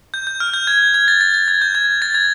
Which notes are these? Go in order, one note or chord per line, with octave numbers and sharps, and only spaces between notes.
G6
G6
F6
G6
G#6
G#6
A6
A6
A6
G#6
G6
G#6
A6
G#6